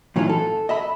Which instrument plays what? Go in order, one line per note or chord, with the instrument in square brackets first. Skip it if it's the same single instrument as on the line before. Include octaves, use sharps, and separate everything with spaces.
[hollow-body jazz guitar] A2 E3 F#3 C4 D#4 F4
A4
D#5 E5 B5